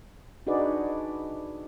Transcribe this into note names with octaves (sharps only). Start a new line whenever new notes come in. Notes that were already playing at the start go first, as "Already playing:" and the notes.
D4 D#4 F#4 G#4 B4 D5